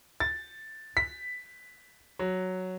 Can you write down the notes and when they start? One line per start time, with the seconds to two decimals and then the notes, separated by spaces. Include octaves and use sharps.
0.20 A6
0.97 B6
2.19 F#3